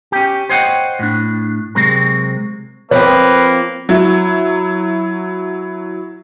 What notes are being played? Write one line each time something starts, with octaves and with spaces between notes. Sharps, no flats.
C#4 G4
C5 C#5 D#5 F#5 G5
A2 D4
C3 F#3 G#3 C4 A#4
F3 A#3 C4 B4 C#5
F#3 E4